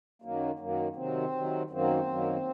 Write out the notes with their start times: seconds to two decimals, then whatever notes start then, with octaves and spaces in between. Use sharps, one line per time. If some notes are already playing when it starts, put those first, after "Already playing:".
0.22 F#2 D#3 F#3 A#3
0.59 F#2 D#3 F#3 A#3
0.96 C3 D#3 F#3 C4
1.32 C3 D#3 F#3
1.70 F#2 D#3 F#3 A#3 C4
2.07 F#2 D#3 F#3 A#3